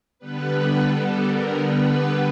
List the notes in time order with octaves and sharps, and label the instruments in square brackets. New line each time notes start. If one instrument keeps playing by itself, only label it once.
[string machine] D3 G3 B3 B4
A4
A#4
B4